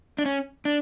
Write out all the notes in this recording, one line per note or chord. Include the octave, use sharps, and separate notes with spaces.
D4
C#4
D4